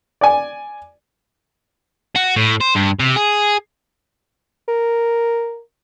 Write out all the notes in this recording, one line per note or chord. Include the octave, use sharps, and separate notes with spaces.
D5 G#5
F#4
A2
C5
G2
C3
G#4
A#4